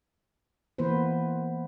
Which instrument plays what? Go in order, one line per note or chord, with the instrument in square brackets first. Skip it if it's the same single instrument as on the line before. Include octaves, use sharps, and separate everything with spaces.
[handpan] E3 A#3 B3 B4 C5